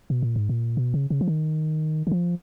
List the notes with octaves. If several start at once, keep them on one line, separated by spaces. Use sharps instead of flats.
B2
A#2
G#2
A#2
B2
C#3
C#3
F3
D#3
D#3
F3